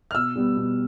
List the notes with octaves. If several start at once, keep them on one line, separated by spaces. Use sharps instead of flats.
F6
B2 E6
G3 B3
B2